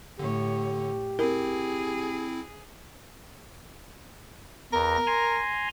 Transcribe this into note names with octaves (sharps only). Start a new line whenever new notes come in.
A2 D3 G4 C#5
C4 E4 G#4 A#4
E2 A#4 A#6
G#5 A#5 C6